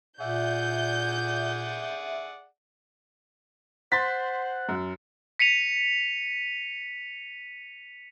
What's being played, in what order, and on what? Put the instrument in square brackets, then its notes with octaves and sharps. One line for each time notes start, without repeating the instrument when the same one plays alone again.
[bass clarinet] A#2 [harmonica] G#4 D5 F#5 [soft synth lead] E5 [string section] G6
[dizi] C5 [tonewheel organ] F#5 [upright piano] C6 A6 B6
[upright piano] F#2
[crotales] B6 C#7 D#7 F7